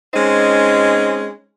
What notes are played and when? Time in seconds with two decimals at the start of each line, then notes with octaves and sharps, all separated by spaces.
0.13 G#3 C4 C#4 D#4